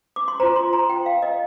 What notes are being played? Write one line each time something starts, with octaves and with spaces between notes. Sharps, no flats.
D6
C6
F4 C5 A#5
C6
A#5
G5
F5
D#5